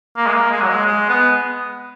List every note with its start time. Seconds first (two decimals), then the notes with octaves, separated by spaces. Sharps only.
0.17 A#3
0.27 G#3
0.34 A#3
0.51 G#3
0.62 F#3
0.69 G#3
0.86 G#3
1.09 B3